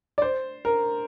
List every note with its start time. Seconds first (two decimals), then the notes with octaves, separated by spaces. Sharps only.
0.18 D5
0.22 C5
0.65 A#4